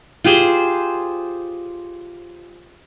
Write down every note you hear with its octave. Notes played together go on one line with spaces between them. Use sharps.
F4 G4 G#4 C5